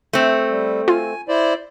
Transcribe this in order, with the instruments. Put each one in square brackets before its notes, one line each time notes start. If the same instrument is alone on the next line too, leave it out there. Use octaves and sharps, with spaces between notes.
[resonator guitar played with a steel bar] A3 C4
[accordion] G3
[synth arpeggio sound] F4 [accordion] G#5
[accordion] E4 C5 D5